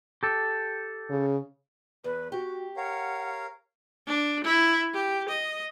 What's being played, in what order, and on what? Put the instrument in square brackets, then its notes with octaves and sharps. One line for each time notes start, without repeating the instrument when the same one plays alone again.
[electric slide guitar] G4 A4
[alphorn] C#3
[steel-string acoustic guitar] E2 [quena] B4
[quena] F#4 [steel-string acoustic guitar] G4
[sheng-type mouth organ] A#4 C#5 F5 [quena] F#5
[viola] D4
E4
G4
D#5